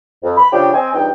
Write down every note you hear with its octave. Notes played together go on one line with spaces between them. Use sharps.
F2
B5
C#3 F3 D4 G4
C4 C5 D#5 G#5
E2 G2 F3 D#4 G5